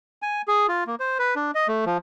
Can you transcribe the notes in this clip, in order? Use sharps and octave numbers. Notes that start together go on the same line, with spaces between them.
G#5
G#4
F4
A#3
C5
B4
D4
D#5
A3
F3